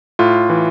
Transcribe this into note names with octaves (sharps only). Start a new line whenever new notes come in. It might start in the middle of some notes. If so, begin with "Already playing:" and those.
A2 F4
E3